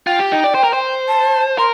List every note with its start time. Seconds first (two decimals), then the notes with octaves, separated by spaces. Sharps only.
0.07 F4 G5
0.19 G4
0.32 D#4
0.44 D5
0.54 C5
0.64 A#4
0.73 C5
1.08 A5
1.58 A#4 C6